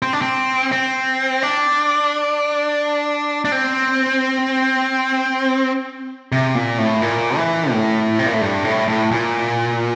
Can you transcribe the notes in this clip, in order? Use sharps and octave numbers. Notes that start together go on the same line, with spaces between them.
C4
D4
C4
C4
D4
D4
C4
C3
A#2
A2
A#2
E3
A2
C3
A#2
A2
G2
A2
A2
A#2